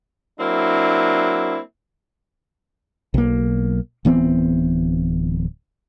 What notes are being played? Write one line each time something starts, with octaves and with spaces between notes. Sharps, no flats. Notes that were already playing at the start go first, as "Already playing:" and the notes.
F#3 A#3 C4 D4 E4
B1 A#3
D1 E3 B3 C4